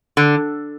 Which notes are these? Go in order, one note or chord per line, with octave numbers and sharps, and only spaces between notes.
D3